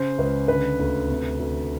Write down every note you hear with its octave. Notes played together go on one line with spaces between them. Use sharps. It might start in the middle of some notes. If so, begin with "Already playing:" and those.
Already playing: C#3 C5
C#2 B4
D3 B4
D2
C3
D2